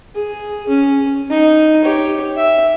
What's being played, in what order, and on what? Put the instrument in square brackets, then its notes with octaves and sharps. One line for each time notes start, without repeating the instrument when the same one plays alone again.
[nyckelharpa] G#4
C#4
D#4
G4 C#5
E5